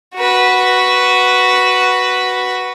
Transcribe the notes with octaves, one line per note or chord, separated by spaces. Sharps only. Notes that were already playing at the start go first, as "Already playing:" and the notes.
F#4 B4